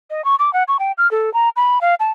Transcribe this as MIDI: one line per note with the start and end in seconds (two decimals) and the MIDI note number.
0.10 0.24 75
0.25 0.36 85
0.39 0.52 86
0.53 0.64 78
0.68 0.77 85
0.79 0.92 79
0.98 1.09 89
1.11 1.32 69
1.34 1.49 82
1.56 1.81 83
1.81 1.95 77
2.00 2.11 81